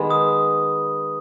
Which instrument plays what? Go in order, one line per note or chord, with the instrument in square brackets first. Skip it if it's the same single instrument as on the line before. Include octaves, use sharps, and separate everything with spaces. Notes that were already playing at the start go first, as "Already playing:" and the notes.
Already playing: [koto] D#3 G#3 B3
[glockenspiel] D#6